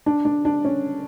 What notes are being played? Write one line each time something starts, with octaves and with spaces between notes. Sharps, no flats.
D4
D4
D4
C#4